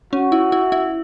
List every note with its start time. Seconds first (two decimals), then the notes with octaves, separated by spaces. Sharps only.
0.13 C#4 F#4
0.32 E4
0.52 E4
0.72 E4